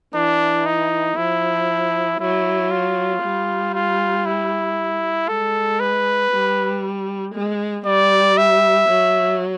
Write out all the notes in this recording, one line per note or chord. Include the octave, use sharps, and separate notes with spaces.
E3 D4
D#4
F3 E4
F#3 E4
F4
G3
F4
E4
G#3 A4
B4
G3
G#3
G3 D5
E5
F#3